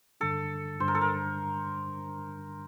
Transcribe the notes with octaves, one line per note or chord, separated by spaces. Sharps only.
G2 D3 G3 D4 A4
G2 D3 G3 D4 C5
A#4
A4
A#4